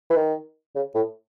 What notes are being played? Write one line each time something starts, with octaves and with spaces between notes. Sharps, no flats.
E3
D#3
C#3
A2